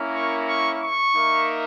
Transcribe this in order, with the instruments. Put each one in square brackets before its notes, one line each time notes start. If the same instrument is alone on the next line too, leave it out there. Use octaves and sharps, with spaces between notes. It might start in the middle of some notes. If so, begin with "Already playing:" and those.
Already playing: [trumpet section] A#3 C#4 E4 A#4
[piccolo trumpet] C#6
C#6
C#6
[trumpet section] A#3 D#4 A#4 E5